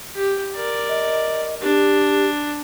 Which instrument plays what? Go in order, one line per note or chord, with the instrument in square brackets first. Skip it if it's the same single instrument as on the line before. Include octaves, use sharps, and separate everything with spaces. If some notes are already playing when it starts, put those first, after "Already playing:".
[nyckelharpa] G4
A#4 D5
[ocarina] D#5
[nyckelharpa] D4 [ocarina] G4